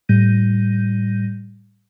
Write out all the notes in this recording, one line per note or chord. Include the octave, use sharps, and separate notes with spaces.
A2 G3 G6 A#6 D#7